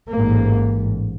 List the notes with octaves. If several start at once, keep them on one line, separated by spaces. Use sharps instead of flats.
A1 G#2 A#3